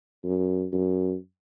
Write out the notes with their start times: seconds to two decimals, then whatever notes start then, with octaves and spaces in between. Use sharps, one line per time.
0.24 F#2
0.72 F#2